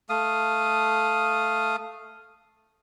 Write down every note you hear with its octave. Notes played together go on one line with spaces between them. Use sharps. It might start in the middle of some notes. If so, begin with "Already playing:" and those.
A3 F5 D#6